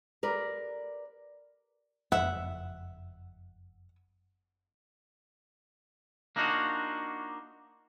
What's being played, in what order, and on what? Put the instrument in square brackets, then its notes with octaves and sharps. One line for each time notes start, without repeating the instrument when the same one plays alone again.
[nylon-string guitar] G4 A#4 B4 D5
[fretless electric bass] F#1 F2 [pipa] E5 [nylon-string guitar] F#5
[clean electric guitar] A#3 D4 D#4 F4 F#4